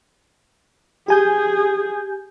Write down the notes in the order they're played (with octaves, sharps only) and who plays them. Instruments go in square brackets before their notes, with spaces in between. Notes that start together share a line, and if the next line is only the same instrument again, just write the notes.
[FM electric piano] G4 G#5 G6 [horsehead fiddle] G#4